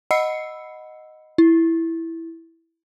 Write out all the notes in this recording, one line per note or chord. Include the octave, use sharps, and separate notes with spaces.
D#5 F#5 B5 E6 C7 C#7
E4